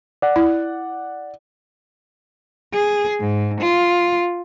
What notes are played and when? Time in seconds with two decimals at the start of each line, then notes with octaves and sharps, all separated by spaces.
0.22 D5 F#5
0.36 E4
2.73 G#4
3.20 G#2
3.61 F4